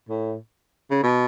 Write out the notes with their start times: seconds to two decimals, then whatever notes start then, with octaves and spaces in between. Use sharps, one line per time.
0.09 A2
0.91 C#3
1.03 B2